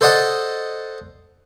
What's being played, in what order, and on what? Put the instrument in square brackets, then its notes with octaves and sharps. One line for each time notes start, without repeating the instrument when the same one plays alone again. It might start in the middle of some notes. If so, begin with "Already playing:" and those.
[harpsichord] A4 C5 D5 D#5 F#5 A5